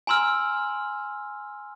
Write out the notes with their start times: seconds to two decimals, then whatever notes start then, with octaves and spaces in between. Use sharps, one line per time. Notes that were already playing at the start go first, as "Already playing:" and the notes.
0.07 G#5 A#5 C6 E6 F6